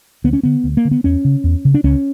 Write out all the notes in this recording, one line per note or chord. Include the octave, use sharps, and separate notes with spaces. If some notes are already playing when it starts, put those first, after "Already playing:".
D2 B3
C#4
D3 B3
D2
A#3
D3
B3
E2 C#4
C#3
E2
C#3
D4
C#2 C#4